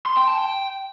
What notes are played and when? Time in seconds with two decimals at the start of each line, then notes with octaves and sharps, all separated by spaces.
0.06 C6
0.17 G5
0.27 A5
0.38 G5